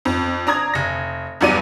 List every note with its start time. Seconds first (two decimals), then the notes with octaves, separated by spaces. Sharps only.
0.05 F2
0.47 D4 A#5 D#6 G#6
0.74 F1 A#6
1.41 E2 G2 F#3 D5 D#7